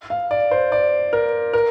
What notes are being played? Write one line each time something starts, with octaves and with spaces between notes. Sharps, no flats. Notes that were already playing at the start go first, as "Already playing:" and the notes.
F5
D5
C5
D5
A#4
A#4